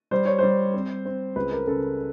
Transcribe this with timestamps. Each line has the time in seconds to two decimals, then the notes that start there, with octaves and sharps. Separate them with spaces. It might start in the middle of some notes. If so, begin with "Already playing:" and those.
0.11 G3 C5
0.25 C#5
0.39 G3 C5
0.74 C4
1.06 C4
1.36 C#2 B4
1.52 A#4
1.67 C#3 A4